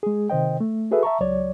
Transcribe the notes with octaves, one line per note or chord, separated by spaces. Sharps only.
G#3 G#4
C3 D#3 C5 D#5 G5
A3
F#4 G#4 A4 B4 E5
E5 A5 A#5 C#6
C#2 F#3 C#5 D5